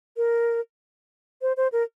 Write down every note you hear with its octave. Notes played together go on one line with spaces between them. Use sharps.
A#4
C5
C5
A#4